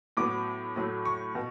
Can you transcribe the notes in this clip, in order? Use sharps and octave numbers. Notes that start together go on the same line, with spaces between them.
A2 F#3 B3 D6
A2 F#3 A3
C#6
B2